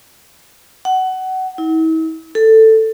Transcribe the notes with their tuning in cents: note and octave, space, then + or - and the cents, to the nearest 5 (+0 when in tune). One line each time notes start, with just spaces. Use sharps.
F#5 +20
E4 -45
A4 +10